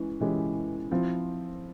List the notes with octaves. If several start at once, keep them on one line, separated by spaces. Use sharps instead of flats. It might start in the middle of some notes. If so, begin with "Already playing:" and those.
Already playing: E3 G#3 C#4 E4
E3 G#3 C#4 E4 G4
F3 C4 E4